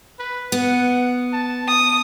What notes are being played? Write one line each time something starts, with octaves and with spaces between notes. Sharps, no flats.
B4
B3 F#5
A5
D#6